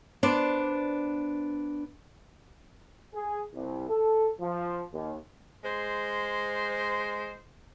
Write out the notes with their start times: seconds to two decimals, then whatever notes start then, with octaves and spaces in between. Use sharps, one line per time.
0.23 B3 D4 C5 D5
3.14 G#4
3.55 C2
3.89 A4
4.41 F3
4.93 D#2
5.64 G#3 C5